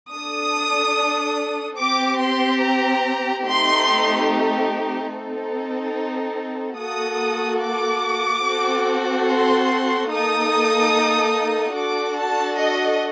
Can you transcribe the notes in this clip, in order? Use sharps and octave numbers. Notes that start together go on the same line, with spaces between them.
D4 A4 D#6
C4 G4 D6
C6
A#5
A3 C4 D#4 G4 C6
C4 D#4 A4
A#3 F#4 A4 D#6
D6
C4 F#4 A4
C6
A#3 D#4 A4 D#6
D4 F#4 A4 D6
A5
D#5